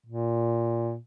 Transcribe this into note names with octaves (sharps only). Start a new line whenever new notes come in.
A#2